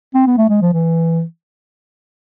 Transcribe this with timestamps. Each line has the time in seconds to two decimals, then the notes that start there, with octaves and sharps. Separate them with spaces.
0.14 C4
0.27 B3
0.38 A3
0.49 G#3
0.61 F3
0.73 E3